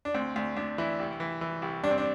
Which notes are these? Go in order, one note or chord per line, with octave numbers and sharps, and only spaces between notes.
D4
D2 C4
D2
D2 D4
E3 E4
C2
E3
E3
C2
G2 D4
C4
D4